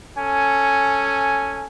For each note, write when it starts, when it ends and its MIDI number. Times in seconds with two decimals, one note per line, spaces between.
0.17 1.67 61
0.17 1.67 69
0.17 1.67 80